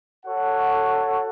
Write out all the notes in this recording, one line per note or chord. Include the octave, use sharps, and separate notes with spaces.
F#4 A4 C#5 F#5